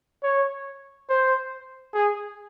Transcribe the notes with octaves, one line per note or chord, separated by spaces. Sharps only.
C#5
C5
G#4